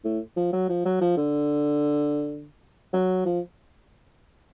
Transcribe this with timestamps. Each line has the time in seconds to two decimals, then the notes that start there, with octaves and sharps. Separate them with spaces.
0.05 A2
0.37 F3
0.53 F#3
0.69 F3
0.85 F#3
1.01 F3
1.17 D3
2.93 F#3
3.25 F3